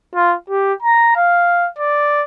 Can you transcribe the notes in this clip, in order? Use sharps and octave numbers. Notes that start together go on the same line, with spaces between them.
F4
G4
A#5
F5
D5